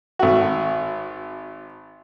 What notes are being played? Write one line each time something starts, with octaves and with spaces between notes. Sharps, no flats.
G#1 F#4